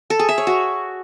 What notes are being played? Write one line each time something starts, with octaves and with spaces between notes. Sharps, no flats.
A4
G#4
E5
C#5
F#4